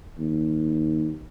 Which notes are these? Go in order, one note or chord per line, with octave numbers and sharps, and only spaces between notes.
D#2